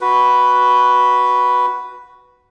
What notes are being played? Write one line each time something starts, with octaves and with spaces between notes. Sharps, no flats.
F#4 B4